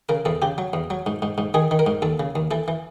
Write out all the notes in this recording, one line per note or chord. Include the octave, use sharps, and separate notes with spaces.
C#3 A#4
E2 A4
C#3 G4
F#3
E2
F#3
G#2
G#2
G#2
D#3 G#4
D#3
A#4
G#2
D#2 A4
C#3
D#2
E3 A4
E3